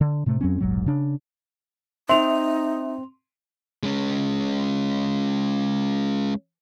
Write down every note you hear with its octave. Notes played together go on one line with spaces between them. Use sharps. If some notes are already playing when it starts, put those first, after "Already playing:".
D3
A2 C3 A3
F2 F#3 C4 C#4
E1 A#1 G#2 F#3
C#3 D4
C4 D#4 E5 C6 F7
G#3 C#4